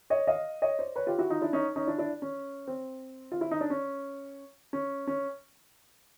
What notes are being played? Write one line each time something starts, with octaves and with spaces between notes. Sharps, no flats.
C#5 D#5
D#5 F5
C#5 D#5
C5 D5
B4 C#5
F4 G4
E4 F#4
D#4 F4
D4 E4
C#4 D#4
C#4 D#4
D4 E4
D4 E4
C#4
C4
F4
E4
D#4
D4
C#4
C#4
C#4